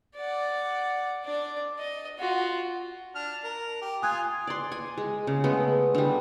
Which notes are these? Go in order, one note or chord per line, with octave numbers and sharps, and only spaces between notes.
D5 F#5
D4 D5
D#5
F4 F#4
D4 F6
A#4
G4
F4 G#5 D#6 F#6 G#6
D5 C6
G#5
G#3
C#3
G#3 A3 B3
D3 G3